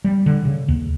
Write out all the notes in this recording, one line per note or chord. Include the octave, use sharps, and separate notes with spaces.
G3
D3
C#3
D#2